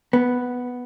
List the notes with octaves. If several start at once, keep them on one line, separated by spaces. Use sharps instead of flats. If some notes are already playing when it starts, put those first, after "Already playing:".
B3